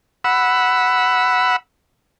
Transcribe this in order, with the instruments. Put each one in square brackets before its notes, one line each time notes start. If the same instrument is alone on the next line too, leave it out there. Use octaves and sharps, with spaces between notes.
[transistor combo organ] F#5 B5 E6